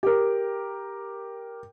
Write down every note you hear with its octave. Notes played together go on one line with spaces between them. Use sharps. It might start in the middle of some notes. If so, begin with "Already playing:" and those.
G4 A#4